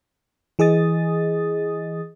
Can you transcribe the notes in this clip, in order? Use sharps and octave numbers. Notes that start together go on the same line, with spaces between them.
E3 G#4 D#5 D#6 A6